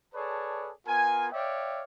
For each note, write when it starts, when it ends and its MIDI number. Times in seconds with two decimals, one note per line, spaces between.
0.14 0.71 68
0.14 0.71 69
0.14 0.71 71
0.14 0.71 73
0.14 0.71 74
0.14 0.71 81
0.87 1.27 59
0.87 1.27 65
0.87 1.27 70
0.87 1.27 80
1.32 1.82 73
1.32 1.82 74
1.32 1.82 76
1.32 1.82 77
1.32 1.82 79